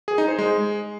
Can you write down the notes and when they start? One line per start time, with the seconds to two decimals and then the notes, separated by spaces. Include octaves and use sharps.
0.08 G#4
0.18 D#4
0.28 C5
0.38 G#3